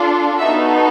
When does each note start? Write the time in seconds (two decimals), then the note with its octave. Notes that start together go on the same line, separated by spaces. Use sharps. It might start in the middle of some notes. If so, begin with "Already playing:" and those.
Already playing: D4 F4 A4
0.40 B3 D#4 F#4 A4 E5